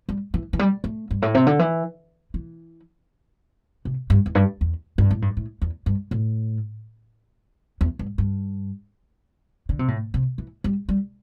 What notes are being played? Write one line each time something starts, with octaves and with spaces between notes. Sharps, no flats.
G3
E3
E3
G3
A3
G2
A2
C3
D3
E3
E3
C3
G2
E2
G2
E2
G2
A2
G2
A2
E2
G2
A2
E2
G2
G2
D3
C3
A2
C3
E3
G3
G3